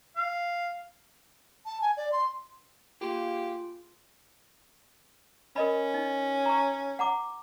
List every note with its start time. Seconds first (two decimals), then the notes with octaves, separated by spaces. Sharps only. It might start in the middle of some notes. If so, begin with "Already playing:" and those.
0.16 F5
1.66 A5
1.81 G#5
1.97 D5
2.12 C6
3.01 A#3 F4 G4 G#4 C6
5.56 C#4 A#4 D#5 B5
5.94 D#4
6.46 A#5 C#6
6.99 F#5 A#5 D6